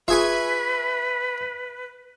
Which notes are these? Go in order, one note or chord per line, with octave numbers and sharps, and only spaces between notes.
F4 G#4 B4 E5 G#5 C#6